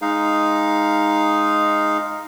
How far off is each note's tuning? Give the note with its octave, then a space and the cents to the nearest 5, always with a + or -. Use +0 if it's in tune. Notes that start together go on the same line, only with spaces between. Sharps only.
G#3 +0 D#4 +0 F5 +0